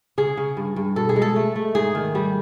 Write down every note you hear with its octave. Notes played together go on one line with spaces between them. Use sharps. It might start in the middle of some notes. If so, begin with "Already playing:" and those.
C#3 G#4
C#3
G2
G2
B2 A4
G#4
G#3
A4
A3
A3
G#2 G#4
D#3
G3